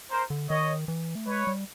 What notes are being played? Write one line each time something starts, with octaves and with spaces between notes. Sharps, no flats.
A#4 C5
D3
D#3 C#5 D#5
E3
A3
G#3 B4 C#5
G3